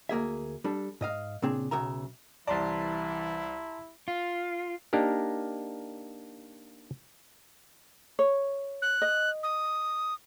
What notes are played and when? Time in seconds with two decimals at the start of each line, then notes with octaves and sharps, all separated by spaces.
0.09 D2 A#3 G#4 E5
0.64 G3 D4 A4
1.01 G#2 D#5 F5
1.42 A#2 C#3 C4 D4 G#4
1.71 B1 C#3 E5 A#5
2.47 C2 E3 E4 D5 A5 A#5 C6
4.08 F4
4.93 A#3 D4 D#4 G4 A#4
8.19 C#5
8.82 F#6
9.02 D#5
9.43 D#6